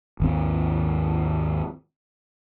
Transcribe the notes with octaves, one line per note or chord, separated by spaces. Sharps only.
G#1 D#2 C4